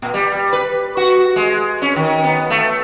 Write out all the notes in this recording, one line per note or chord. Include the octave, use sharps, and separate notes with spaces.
A#2
G3
B4
F#4
G#3
C#4
D#3
B3
A3